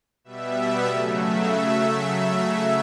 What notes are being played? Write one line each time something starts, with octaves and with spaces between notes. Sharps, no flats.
B2 G3 B3 E5
C#3 F#3 A3
E5